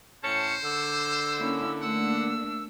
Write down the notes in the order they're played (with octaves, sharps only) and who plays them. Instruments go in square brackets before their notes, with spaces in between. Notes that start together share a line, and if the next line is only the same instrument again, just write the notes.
[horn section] A2 C#4 A5 [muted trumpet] C5 [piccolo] C#7
[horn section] D3 [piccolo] E6
[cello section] A#3 C#4 E4
[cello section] A3 A#3 D4 [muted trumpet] F#5 [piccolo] E6